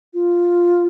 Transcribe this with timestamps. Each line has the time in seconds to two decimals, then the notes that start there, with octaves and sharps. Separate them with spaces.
0.14 F4